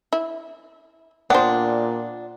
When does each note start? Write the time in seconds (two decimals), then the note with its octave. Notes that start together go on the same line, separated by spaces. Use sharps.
0.13 E4
1.30 A#2 B3 D4 C5 F#5 G5 D#6